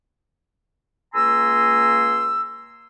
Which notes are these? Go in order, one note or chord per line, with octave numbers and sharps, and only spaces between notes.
C#2 A#3 G#5 A#5 C6 E6